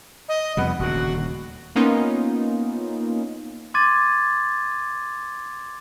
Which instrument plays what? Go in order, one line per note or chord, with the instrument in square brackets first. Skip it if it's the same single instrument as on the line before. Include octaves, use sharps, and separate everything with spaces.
[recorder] D#5
[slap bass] F2 C3 G3 [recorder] B3
[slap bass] D#1 D2 C#3 [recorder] F#4
[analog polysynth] A#3 B3 C#4 D#4 F4
[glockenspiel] C6 D6 G#6 A6 D#7